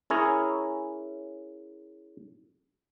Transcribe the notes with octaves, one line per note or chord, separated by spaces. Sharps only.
C#4 E4 G#4 A#4 C#5